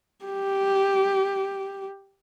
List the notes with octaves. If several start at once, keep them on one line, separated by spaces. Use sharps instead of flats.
G4